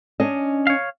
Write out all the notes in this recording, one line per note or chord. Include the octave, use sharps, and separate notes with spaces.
C#4 D4 D#5
C#5 F5